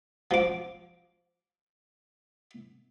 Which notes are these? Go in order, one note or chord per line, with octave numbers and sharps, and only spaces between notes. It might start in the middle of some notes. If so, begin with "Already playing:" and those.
F3 D6